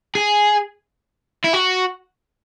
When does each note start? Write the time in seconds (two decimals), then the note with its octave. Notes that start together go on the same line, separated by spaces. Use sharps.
0.15 G#4
1.45 E4
1.54 F#4